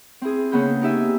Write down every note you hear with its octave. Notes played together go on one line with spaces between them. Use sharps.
C4 E4 G#4
C#3 A#3 B3 B5 G6
D#4 G4 E5 G#5